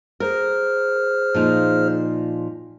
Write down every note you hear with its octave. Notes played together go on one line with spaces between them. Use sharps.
G#4 A#4 C5 F6
A#2 F3 D#4